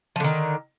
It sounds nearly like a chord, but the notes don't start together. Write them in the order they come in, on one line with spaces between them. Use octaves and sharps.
F3 D3 D#3